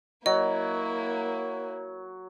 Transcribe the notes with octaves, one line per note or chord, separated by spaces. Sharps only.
F#3 A#3 E4 D#5